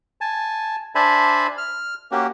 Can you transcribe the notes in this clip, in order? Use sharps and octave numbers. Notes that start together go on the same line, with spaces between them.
G#5 A5
D4 C5 E5 G#5 A5 B5
F6
A#3 C#4 F#4 G4